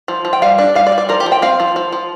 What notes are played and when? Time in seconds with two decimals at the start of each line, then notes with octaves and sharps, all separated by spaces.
0.08 F3
0.25 F3
0.33 G5
0.42 G3 F5
0.58 D4
0.75 G3 F5
0.87 D5
0.92 G3
0.98 D5
1.09 F3 A#4
1.20 G4
1.26 F3
1.32 G5
1.42 C4 F5
1.60 F3
1.76 F3
1.92 F3